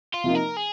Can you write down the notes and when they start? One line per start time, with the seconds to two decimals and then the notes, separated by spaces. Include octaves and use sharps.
0.14 F4
0.24 C3 F3 A#3 D#4
0.35 A#4
0.57 G#4